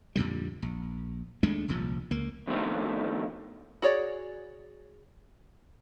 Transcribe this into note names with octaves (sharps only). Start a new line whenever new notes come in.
F2 A#2 D3 G3
A#1
D#2 G#3 A3 D4
D#1 C2 A#2 F3
C#2 A#3
F2 B2 D3 D#3 A3 C4
F#4 G#4 C#5 D5